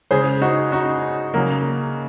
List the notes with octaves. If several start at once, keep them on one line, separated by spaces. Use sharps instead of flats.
C#3 G#3 G#4 C5
D#4 F#4
D#4 F#4
C#3 F#3 A#3